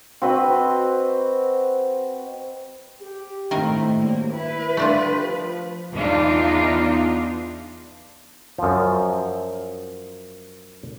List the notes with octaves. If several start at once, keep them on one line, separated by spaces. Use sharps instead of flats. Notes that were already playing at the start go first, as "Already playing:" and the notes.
C4 F#4 B4 D#5
G4
A2 D#3 C4 E4 A#4 F5
G2 F#3 G3 A#3
E4 B4
D3 G3 A3 D4 F4
F3
E2 E3 B3 D4 D#4 F4
F#2 F3